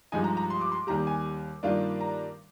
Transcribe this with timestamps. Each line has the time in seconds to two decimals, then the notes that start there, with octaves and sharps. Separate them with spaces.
0.12 G2 F3 G#3 D#4 G#5
0.24 A#5
0.37 A#5
0.50 C6
0.61 D6
0.72 C6
0.87 D#2 D#3 G3 A#5
1.07 G#5
1.63 G2 D#3 A#3 D4 F4
2.01 A#5